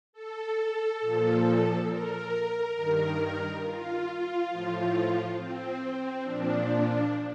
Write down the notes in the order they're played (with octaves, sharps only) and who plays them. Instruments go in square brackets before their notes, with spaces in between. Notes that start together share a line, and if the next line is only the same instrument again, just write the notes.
[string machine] A4
A#2 F3
A#4
G2 D#3
F4
A2 F3
C4
C4
A#2 F3 D4